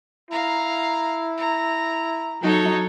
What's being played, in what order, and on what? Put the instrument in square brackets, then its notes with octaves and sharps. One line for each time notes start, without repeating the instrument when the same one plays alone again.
[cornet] E4 [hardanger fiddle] F5 A#5
[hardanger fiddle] A#5
[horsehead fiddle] F#3 D#4 [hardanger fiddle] A4 C#5